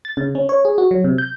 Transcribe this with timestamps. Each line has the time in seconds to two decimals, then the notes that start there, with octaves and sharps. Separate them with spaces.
0.05 A6
0.17 C#3
0.35 C#4
0.49 C#5
0.65 G#4
0.78 F#4
0.91 F#3
1.04 C3
1.18 G6